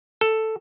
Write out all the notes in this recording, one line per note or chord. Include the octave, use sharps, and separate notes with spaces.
A4